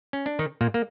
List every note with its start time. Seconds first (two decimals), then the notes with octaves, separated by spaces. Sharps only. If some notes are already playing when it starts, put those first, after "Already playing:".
0.13 C#4
0.26 D4
0.39 D#3 D#4
0.61 A#2 A#3
0.74 A#3